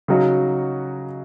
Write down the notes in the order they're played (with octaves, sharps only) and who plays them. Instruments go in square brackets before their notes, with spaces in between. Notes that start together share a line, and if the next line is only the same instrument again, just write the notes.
[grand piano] C#3 F#3 D#4 F#4